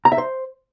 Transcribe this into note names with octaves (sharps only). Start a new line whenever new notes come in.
A#5
E5
C5